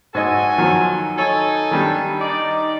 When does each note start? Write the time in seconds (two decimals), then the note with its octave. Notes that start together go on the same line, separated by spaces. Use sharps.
0.15 G#2 F#4 A4 D#5 G#5 E6
0.58 D#3 F3 F#3
1.18 D#4 A4 C#5 G#5
1.71 D#3 G3 D4
2.21 D#4 D5